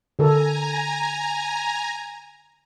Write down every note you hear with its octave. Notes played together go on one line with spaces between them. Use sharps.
D3 A4 A#4 G#5 A#5